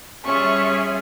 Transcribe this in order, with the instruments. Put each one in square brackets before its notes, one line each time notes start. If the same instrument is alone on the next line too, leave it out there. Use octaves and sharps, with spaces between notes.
[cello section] G3 E5 [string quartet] C#4 F4 G#4 [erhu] C#6